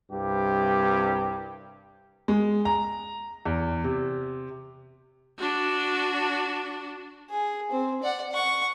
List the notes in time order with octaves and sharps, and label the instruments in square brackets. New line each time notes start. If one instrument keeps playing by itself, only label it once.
[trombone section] C2 G2 C3 G4
[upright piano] G#3
A#5
E2
C3
[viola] D4 F#4
[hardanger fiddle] G#4
C4
D5 F#5
F#5 C#6